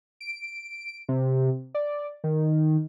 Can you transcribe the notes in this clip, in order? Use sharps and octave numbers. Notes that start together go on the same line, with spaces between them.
D7
C3
D5
D#3